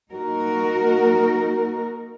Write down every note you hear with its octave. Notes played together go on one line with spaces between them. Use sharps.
A#3 D#4 F#4 A#4